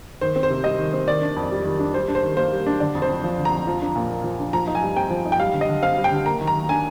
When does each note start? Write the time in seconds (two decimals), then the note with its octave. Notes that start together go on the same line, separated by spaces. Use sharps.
0.21 D#3 C5
0.36 C4
0.43 C5
0.50 C3
0.64 G3 D#5
0.79 D#3
0.93 C4
1.07 D#3 D5
1.22 D4
1.36 F2
1.51 G3
1.65 D#3
1.79 D4
1.94 G3 C5
2.08 D4
2.15 C5
2.23 D#3
2.37 A#3 C5
2.52 G3
2.66 D4
2.80 D3 D5
2.95 F2
3.02 C5
3.09 F2
3.24 F3
3.38 D3
3.45 A#5
3.52 F2
3.67 F3
3.81 D4
3.96 A#2
4.10 A#3
4.24 F3
4.39 D4
4.53 F3 A#5
4.67 D#4
4.75 G#5
4.82 G2
4.96 C4 G5
5.10 F3
5.25 D#4
5.32 G5
5.40 G3 F5
5.54 D3
5.61 D#5
5.69 D3
5.83 C4 F5
5.97 G3
6.04 G5
6.11 D3
6.26 A#3 A#5
6.41 D#3
6.47 A#5
6.55 D#3
6.69 D4 G#5